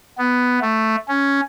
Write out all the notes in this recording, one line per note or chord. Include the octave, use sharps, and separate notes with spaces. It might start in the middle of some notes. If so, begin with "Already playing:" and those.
B3
A3
C#4